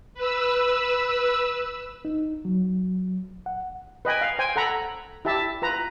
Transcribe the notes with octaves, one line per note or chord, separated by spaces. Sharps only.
B4 E6
D#4
F#3
F#5
B4 D#5 G5 G#5
F5
C5 G5 G#5
A4 F#5 A#5 B5
E4 G4 E5 A5
F4 B4 A#5